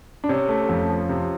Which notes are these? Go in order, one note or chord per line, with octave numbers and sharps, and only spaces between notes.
D4
C3 C#4
A3
F2
F3
C3